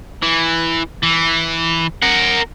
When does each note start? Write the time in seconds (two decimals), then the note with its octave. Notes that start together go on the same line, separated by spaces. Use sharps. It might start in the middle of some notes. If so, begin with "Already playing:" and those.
0.23 E3
1.03 E3
2.02 A#4 F#5